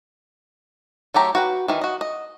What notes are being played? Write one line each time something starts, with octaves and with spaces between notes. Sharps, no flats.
F#3 A3 G4 A#5
F#4 B4 G5
D#3 E3
F#4 D#5
D#5